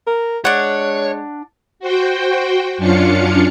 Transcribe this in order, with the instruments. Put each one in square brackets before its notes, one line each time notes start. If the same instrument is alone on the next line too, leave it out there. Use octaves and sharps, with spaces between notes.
[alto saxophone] A#4
[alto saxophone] G#3 [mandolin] D4 F#5 [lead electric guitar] C#5
[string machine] F#4 C5 G5
F#2 C#4 D4 F4 F5 C#7